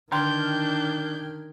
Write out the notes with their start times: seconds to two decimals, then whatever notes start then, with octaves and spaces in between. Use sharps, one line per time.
0.12 D3 D#3 D4 G5 C6 F6 G6 G#6